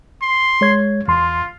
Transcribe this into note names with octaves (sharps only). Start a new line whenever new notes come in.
C6
G#3 C#5 G#6
E2 F4 C6